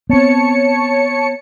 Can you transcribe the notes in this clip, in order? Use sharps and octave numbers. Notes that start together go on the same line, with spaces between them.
B3 C4 C#5 A5 C#7